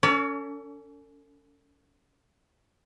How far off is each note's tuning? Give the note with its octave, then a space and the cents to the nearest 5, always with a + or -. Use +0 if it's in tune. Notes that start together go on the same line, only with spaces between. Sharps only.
C#4 +25 A4 +40 D5 -45